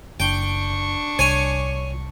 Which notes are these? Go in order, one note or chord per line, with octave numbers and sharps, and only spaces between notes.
F#1 D4 G5 C#6
C2 C#5 G#5